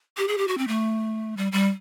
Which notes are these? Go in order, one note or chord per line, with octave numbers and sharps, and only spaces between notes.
G4
G#4
G4
F#4
C4
A3
G3
G3